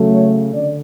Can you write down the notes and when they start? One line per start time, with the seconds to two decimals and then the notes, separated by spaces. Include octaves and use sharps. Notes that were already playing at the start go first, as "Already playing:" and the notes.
Already playing: C#3 F#3 A3
0.13 C#5
0.52 D3 D5